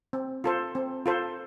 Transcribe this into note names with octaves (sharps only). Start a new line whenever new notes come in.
C4
F4 A4 C5
C4
F4 A4 C5